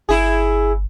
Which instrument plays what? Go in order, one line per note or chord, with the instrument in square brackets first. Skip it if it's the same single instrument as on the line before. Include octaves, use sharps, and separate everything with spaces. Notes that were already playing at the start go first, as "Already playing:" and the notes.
[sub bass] G1 [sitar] E4 G#4